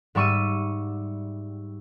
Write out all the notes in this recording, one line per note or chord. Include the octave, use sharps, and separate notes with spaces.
G#2 G3 E5 C#6 E6 D#7